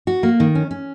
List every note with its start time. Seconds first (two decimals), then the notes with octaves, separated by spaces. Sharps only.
0.07 F#4
0.23 A#3
0.40 D#3
0.55 C#4
0.71 C#4